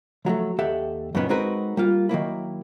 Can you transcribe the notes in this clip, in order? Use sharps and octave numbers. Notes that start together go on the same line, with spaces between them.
F3 F#3 G#3 A3
D#2 G4 A4 E5 F#5
F#2 A#2 D#3 B3 C#4
G#3 C4 D#4 F#4 A#4 B4
G3 A#3 F4
D#3 F#3 A#3 E4